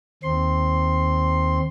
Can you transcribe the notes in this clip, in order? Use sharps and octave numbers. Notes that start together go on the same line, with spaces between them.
D#2 C4 C6